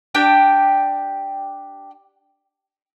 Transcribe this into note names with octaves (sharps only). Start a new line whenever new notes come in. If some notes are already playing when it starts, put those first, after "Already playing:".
D4 G4 G5